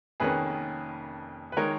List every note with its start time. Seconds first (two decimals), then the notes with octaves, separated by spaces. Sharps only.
0.20 F1 F2 D#3 A#3 C#4 G#4 B4
1.52 B4
1.57 D#3 G#3 D#4 A#4 C#5